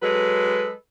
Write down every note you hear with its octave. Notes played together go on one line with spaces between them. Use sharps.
F#3 G#3 A4 B4